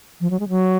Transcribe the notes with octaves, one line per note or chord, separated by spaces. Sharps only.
F3
F#3
G#3
F#3